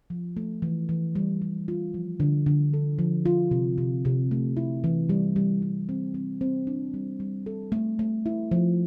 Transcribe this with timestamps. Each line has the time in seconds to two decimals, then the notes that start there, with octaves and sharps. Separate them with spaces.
0.10 F3
0.37 A3
0.62 E3
0.89 E3
1.15 G3
1.42 G3
1.68 F4
1.94 F3
2.20 D3
2.46 D3
2.73 A4
2.99 F3
3.26 F4
3.51 C3
3.78 C3
4.05 C3
4.31 A3
4.57 E4
4.84 E3
5.09 G3
5.36 G3
5.62 G3
5.89 C4
6.14 C4
6.41 C4
6.67 D4
6.94 G3
7.20 G3
7.46 A4
7.72 A3
7.99 A3
8.26 E4
8.51 F3